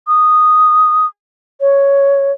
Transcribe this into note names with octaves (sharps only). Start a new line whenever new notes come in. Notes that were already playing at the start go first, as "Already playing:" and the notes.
D#6
C#5